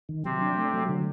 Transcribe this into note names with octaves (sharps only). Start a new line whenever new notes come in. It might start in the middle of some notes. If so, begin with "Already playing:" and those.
D#3
C3 F#3 C4
D4
A3
F#3
D3